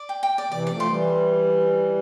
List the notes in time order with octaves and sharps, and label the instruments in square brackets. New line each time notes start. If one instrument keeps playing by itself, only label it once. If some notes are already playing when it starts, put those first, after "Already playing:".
Already playing: [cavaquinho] D5
G5
G5
D5
[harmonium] C3 E3 [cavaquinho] D5
[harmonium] F3 A3 [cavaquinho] D5
[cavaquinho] C6
[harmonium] E3 G3